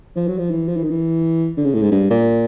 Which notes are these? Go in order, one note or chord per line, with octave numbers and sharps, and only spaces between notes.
F3
F#3
F3
E3
F3
E3
D#3
E3
D3
C#3
A2
G#2
G2
A#2